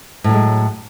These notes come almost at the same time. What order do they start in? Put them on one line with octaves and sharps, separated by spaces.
A2 F#3 G#3